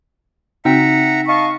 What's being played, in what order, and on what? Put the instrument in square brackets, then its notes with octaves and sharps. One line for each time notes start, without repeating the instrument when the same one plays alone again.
[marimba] C#3 C4 F#4 [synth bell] D#4 G5 [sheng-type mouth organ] E5 F#5 A#5
[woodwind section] D#5 F5 C#6 [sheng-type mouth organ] A5